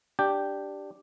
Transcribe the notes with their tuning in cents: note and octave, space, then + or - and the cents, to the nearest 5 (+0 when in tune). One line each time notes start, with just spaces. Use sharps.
D4 +0 G4 +0 G5 +0